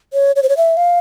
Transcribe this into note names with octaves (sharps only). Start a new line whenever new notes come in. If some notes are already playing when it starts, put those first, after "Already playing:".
C#5
C#5
C5
C#5
E5
F5